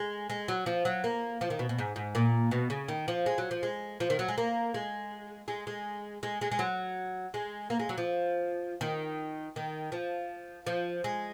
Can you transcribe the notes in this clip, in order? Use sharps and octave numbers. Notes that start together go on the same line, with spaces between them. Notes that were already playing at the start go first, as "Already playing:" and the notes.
Already playing: G#3
G#3
F#3
F3
F#3
A#3
F3
D#3
B2
B2
G#2
G#2
A#2
B2
C#3
D#3
F3
G#3
F#3
F3
G#3
F3
D#3
F#3
G#3
A#3
G#3
G#3
G#3
G#3
G#3
G#3
F#3
G#3
A#3
G#3
F#3
F3
D#3
D#3
F3
F3
G#3